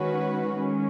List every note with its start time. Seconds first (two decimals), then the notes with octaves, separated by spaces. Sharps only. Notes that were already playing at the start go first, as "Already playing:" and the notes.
Already playing: D#3 G#3 C#4 F#4 B4
0.55 D#3 G#3 C#4